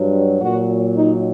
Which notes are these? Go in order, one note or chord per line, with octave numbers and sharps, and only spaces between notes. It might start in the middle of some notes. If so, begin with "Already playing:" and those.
Already playing: G2 F#3
A#2 F#3 F#4
D#4